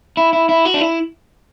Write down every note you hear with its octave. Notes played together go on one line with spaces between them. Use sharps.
E4
E4
E4
F#4
D4
E4